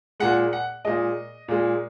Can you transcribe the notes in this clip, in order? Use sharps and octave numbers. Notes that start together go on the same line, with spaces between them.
A#2 G#3 F#5
F#5
A#2 G#3 D#5
A#2 G#3